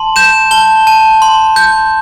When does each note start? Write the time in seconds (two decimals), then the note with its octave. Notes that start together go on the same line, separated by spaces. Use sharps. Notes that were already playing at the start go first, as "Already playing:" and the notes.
Already playing: A5 C6
0.16 G6 E7
0.51 A5 G7
0.87 A5
1.22 C6
1.56 G6